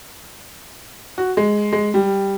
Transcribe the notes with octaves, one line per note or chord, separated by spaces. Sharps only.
F#4
G#3
G#3
G3